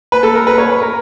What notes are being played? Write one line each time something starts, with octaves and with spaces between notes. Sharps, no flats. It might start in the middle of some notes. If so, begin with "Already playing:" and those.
B4
A4
A#4
B4
C#5
B4
A#4